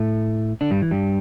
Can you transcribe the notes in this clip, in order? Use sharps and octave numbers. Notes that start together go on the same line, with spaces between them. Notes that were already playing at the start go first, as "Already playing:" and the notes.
Already playing: A2 A3
D3 D4
G2 G3
E3
G2 G3